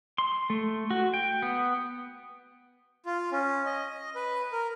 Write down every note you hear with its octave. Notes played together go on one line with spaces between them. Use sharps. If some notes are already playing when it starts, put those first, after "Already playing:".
C6
A3
F#4
G5
B3
F4
C#4
D#5
B4
A#4